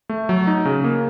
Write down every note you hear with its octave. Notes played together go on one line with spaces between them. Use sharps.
A3
F#3
D#4
C#3
A#3